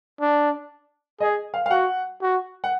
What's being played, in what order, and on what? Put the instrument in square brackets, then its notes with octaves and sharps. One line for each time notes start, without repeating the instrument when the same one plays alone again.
[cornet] D4
[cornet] G#4 [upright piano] D#5
[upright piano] F5
F5
[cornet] F#4 [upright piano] F#5
[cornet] F#4
[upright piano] F#5